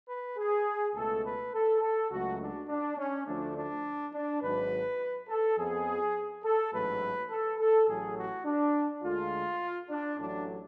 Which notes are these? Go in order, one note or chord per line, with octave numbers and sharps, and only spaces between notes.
B4
G#4
C#2 B2 A3 A4
B4
A4
A4
C#2 C#3 F#3 A3 F#4
D4
D4
C#4
D2 D3 F3 A3 D4
D4
D4
G#1 G#2 F#3 B4
A4
F2 F3 B3 G#4
A4
A1 G#2 F#3 A3 B4
A4
A4
A1 A2 F#3 G#4
F#4
D4
D2 D3 G#3 F4
D4
A1 A2 F#3 A3 D4